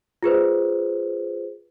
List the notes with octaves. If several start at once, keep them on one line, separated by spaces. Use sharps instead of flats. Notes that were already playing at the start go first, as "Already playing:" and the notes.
F4 G#4 B4 C5